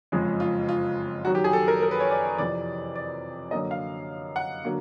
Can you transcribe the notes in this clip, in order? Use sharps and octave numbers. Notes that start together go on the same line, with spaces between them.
F#1 F2 C#3 F3 G#3
F4
F4
F#2 D#3 F#3 F#4
G4
G#4
A4
A#4
A#4
B4
C#5
D5
F2 C3 E3 D5
D5
F#2 D3 F#3 A#3 D#5
F5
F#5
D3 F#3 A#3